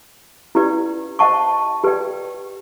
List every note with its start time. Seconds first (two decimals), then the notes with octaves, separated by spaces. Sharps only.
0.55 C#4 E4 G4 B4 D5
1.19 C5 D#5 F#5 A5 C#6
1.84 G4 B4 D5 G5